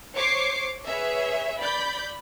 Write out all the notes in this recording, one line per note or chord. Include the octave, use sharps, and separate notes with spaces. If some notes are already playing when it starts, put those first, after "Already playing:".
C5 C#5 C#6 D6 C7
G#4 B4 C#5 E5
D5 B5 G6